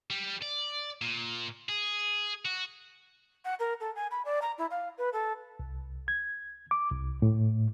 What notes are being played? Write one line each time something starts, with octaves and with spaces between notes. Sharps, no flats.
G3
D5
A#2
G#4
F#4
F#5
A#4
A4
G#5
B5
D5
A#5
E4
F5
B4
A4
C2
G#6
D6
C2
A2